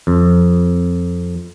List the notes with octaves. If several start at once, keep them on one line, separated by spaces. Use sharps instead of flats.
F2